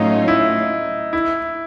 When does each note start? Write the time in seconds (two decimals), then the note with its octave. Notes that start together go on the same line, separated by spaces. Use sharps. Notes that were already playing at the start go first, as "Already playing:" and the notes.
Already playing: A2 F#3 A3 C#4 D#4 F4
0.28 E4
1.13 E4